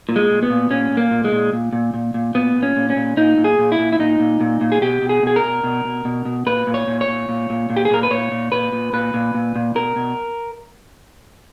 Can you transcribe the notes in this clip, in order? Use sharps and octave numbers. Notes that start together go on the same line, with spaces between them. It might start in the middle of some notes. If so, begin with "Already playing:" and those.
A#2
G#3
A#2
B3
A#2
A#2 C#4
A#2
A#3
A#2
G#3
A#2
A#2
A#2
A#2
A#2
A#2 B3
A#2
C#4
A#2
C#4
A#2
A#2 D#4
A#2
G#4
A#2
E4
A#2
E4
A#2 D#4
A#2
A#2
A#2
G#4
B2 G4
B2
G#4
B2 G#4
A#4
B2
B2
B2
B2
B2
A#2 B4
A#2
C#5
A#2
C#5
A#2
A#2
A#2
A#2
G4
G#4
A#2 A#4
B4
A#2 C#5
A#2
A#2 B4
A#2
A#2 B4
A#2
A#2
A#2
B2 A#4
B2